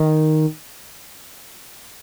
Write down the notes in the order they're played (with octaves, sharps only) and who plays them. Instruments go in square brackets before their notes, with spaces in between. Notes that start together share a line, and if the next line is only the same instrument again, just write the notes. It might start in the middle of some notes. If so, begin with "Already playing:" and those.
Already playing: [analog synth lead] D#3